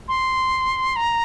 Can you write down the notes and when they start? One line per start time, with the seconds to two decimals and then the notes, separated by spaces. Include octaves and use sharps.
0.08 C6
0.96 A#5